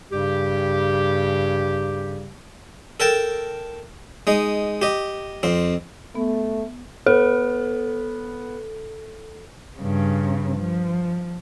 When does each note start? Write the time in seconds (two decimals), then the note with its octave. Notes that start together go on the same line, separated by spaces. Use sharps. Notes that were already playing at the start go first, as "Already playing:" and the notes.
0.11 G2 C#3 G3 G4
3.00 A4 A#4 G5 A5
4.27 G#3 D#4
4.82 G4 D#5
5.43 F2 C4
6.15 A3 B3
7.06 B3 A4
9.78 G2 C#3
10.57 F3